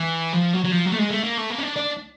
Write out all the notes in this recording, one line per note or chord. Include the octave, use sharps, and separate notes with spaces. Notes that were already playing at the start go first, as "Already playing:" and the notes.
Already playing: E3
F3
F#3
F#3
F3
F#3
A3
G#3
A3
A#3
A3
A#3
C#4
D4
D4